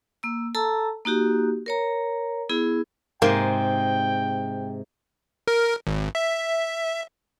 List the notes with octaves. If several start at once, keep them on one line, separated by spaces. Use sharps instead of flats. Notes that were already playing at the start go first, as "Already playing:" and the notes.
A#3 E6
A4 A5 A#5 E6
A#3 D#4 F#4 G4
A#4 C#5 A#5
B3 E4 G#4
G#2 C3 G#3 A#3 G5
A#4
G#1
E5